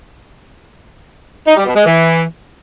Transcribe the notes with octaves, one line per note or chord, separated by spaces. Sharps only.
D#4
G3
B2
G#3
E3